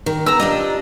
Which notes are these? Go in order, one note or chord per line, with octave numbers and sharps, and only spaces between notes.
D#3
B3 A#5 E6
D4 F4 G4 D#5